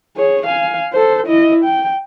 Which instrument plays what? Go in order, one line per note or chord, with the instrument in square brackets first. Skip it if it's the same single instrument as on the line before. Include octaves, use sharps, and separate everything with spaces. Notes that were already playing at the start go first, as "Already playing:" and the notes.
[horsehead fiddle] G#4 C#5
F5 G#5
A4 C5
E4 D#5
G5